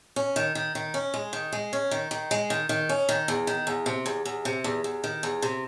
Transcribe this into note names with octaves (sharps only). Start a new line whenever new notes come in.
C#4
D#3
D#3
D#3
C#4
G#3
D#3
G#3
C#4
D#3
D#3
G#3
D#3
D#3
C#4
D#3
E2
D#3
E2
C3
E2
E2
C3
E2
E2
D#3
E2
C3